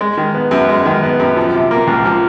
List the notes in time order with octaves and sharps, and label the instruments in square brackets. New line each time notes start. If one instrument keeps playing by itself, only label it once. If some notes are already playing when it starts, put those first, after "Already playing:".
[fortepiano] G#3
D#3
B3
F#2
G#3
D#3
B3
F#2
F3
C3
A#3
C#2
F3